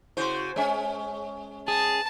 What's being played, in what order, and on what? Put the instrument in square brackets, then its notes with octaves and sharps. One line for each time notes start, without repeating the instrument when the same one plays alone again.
[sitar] C#3 F#4 C5 [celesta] E4 C6
[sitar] G#3 C#4 [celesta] C#5 G#5
[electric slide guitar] G#4 [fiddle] A5 [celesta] D#6